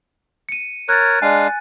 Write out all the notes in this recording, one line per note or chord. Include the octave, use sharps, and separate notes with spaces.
C#7 D#7
A#4 C#5 F#6 A6
G#3 D4 F5 G#5